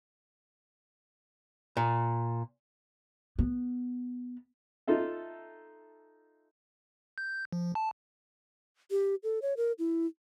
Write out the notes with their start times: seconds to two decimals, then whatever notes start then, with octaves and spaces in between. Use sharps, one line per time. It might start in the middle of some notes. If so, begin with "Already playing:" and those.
1.77 A#2
3.39 B3
4.87 D#4 F4 A4 E5
7.18 G6
7.53 F3
7.75 A5
8.91 G4
9.23 A4
9.42 C#5
9.57 A#4
9.79 E4